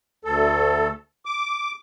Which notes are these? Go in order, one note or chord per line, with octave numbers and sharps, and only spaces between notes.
D2 A4
D6